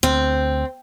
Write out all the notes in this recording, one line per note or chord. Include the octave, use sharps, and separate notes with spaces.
D2 C4